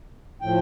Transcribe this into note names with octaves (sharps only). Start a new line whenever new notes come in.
A2 F3 G5